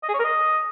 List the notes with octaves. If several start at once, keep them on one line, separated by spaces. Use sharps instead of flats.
D#5
G#4
C#5
A#4
D#5